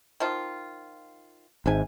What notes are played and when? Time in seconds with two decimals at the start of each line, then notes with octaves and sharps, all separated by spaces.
0.20 D#3 F3 F4
1.66 G#1 G#2 C3 D4 G#5